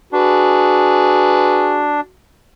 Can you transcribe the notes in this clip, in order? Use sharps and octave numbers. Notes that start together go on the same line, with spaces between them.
D4 F#4 G#4 B4